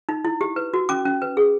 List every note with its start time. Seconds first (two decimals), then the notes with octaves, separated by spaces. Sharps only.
0.09 D#4
0.25 E4
0.41 G4
0.56 B4
0.74 F#4
0.89 C#4 D6
1.05 C#4
1.22 B4
1.37 G#4